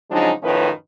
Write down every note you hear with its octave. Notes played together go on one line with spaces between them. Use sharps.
C#3 F3 F#3 G#3 D4 D#4
F#2 A2 D#3 F3 C#4 B4